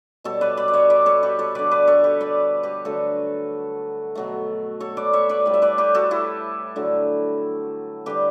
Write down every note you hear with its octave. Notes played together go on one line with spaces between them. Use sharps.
B2 G3 A4 C#5
B4 D5
B4 D5
D5
C#5 E5
B4 D5
A4 C#5
G4 B4
A4 C#5
D3 G3 B4 D5
B4 D5
A4 C#5
G4 B4
B4 D5
G4 B4
D3 F#3 A3 F#4 A4
B2 F#3 A3
A4 C#5
B4 D5
C#5 E5
B4 D5
A2 G3
E5
B4 D5
G4 B4
F#4 A4
E4 G4
D3 F#3 A3
D3 G3 G4 B4